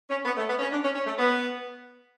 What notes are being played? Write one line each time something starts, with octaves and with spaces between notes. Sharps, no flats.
C#4
B3
A3
B3
C#4
D4
C#4
C#4
A3
B3